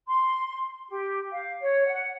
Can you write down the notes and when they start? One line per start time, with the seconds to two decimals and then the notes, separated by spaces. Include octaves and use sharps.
0.08 C6
0.90 G4
1.31 F5
1.61 C#5
1.87 F#5